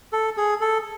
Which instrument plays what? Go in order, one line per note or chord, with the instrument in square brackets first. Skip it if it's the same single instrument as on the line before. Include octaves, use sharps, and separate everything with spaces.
[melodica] A4
G#4
A4